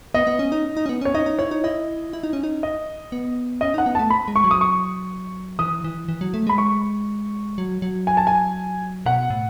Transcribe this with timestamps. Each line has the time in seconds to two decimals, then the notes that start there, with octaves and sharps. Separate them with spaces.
0.14 B3 D#5
0.27 B3
0.39 C#4
0.52 D#4
0.77 D#4
0.86 C#4
0.89 B3
1.01 C#4 C#5
1.15 D#4 D#5
1.26 D#4
1.39 E4 C#5
1.51 D#4
1.64 E4 D#5
2.13 E4
2.23 D#4
2.33 C#4
2.44 D#4
2.63 D#5
3.12 B3
3.61 C#4 D#5
3.74 D#4 F#5
3.86 B3
3.95 A3 A5
4.10 B5
4.28 G#3
4.36 C#6
4.44 F#3
4.51 D#6
4.61 C#6
5.59 E3 D#6
5.84 E3
6.09 E3
6.21 F#3
6.34 A3
6.47 G#3 B5
6.58 C#6
7.58 F#3
7.82 F#3
8.07 G#5
8.17 A5
8.27 G#5
9.06 B2 F#5
9.30 A2